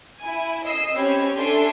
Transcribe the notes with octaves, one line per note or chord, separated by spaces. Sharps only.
E4 G#5
D#5 E6 C7
C4 C#4 G4 B5 G#6
D4 A4 E5 G#5 C6